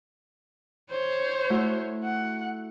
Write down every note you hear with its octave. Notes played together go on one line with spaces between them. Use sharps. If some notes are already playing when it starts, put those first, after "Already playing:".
C5 C#5
A3 E4 F#4
F#5